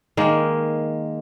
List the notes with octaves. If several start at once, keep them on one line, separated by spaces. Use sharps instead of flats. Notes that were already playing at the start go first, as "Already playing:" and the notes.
D#3 G#3 A#3